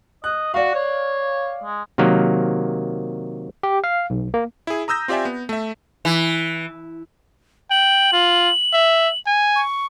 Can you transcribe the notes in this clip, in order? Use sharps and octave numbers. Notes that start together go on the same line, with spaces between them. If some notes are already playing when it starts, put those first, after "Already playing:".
D#5 F#6
F#4 D5 F5
C#5
G#3
C3 D#3 F#3 A#3
G4
F5
B1
A#3
E4 G#4
A#5 D#6 E6 G6 A#6
C4 F4 G4 D5 E5 G#5
B3
A3 E5
E3
G5 F#7
F4
E5
G#5
C#6